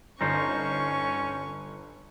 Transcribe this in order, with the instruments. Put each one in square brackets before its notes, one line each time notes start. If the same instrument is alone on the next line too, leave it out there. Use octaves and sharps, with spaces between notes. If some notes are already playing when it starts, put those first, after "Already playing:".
[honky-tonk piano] G1 [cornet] C#4 [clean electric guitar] D#4 F4 C5 [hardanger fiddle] C#6